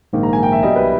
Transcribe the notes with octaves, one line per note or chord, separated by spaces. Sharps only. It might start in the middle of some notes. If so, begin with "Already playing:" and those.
A#1 G#2 D#3 A#3
A#5
G#5
G5
E5
B1 B2 G3 D#5
B4